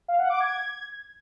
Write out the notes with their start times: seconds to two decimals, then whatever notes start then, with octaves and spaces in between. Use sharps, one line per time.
0.08 F5
0.19 F#5
0.30 D6
0.40 G#6